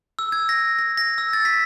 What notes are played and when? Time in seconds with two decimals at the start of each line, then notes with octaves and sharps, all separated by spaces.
0.19 E6
0.32 G#6
0.49 A#6
0.79 A#6
0.97 A#6
1.18 E6
1.33 A6
1.45 B6